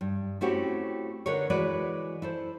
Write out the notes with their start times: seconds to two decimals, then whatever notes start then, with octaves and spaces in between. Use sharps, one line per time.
0.01 G2
0.41 A3 C4 C#4 E4 F#4 G4
1.26 D3 D#4 A#4 B4 C#5
1.50 E3 G#3 F#4 B4 C#5 D5
2.22 E4 A4 C5